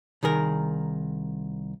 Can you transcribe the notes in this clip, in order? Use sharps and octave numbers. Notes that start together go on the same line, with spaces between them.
C2 D#3 G#4 A#4